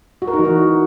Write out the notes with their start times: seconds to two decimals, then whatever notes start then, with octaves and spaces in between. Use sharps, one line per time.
0.22 F#4
0.28 A#4
0.33 D#4
0.39 E3
0.45 F#4